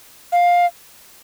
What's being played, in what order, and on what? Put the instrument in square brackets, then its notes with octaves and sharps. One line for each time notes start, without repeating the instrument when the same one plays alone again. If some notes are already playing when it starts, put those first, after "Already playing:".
[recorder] F5